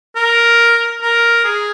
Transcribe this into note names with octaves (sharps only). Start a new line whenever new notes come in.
A#4
A#4
G#4